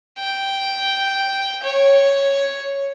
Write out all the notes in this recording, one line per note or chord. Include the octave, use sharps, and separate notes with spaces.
G5
C#5